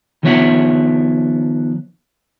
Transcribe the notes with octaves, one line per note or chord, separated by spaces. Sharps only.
D#3 F3 B3 C#5 E5 F#5